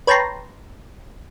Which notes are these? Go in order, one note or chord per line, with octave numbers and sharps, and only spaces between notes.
B4 C#5 G5 A5 A#5 C6